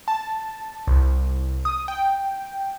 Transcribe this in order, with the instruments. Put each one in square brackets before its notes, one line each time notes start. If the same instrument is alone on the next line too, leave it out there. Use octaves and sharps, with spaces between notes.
[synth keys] A5
C2
D#6
G5